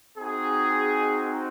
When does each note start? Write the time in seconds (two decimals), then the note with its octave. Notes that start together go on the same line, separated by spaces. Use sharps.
0.17 C4 D#4 F#4 G#4